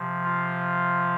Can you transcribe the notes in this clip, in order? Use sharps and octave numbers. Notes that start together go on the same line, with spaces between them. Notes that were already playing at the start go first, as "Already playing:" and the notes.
Already playing: C3 F3
F4